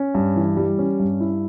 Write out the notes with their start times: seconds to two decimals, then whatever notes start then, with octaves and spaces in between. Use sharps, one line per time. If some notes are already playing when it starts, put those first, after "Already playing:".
Already playing: C#4
0.15 G2
0.36 E3
0.57 G3
0.79 C#4
1.00 G2
1.20 E4